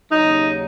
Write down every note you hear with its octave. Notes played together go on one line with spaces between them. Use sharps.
D#2 C#3 F#3 D#4